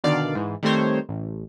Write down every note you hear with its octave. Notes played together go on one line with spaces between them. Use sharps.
B2 D3 D#3 D5 F5
G#2 E3
D#3 G3 A3 C4 C5 C#5
A1